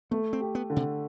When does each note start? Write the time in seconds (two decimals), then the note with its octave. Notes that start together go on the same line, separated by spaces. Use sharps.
0.11 A3 B3
0.33 C4
0.41 G4
0.55 B3
0.70 D3
0.76 C3